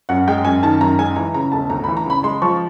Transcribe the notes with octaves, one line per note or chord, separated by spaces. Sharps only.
F#2 F#5
G#3 G5
F#2 G#5
D#3 A5
F#2 A#5
G#3 G#5
E3 A#5
C#3 A#5
E1 A5
D2 A#5
B5
E3
A#5
C#3 B5
G#3 C6
F3 C#6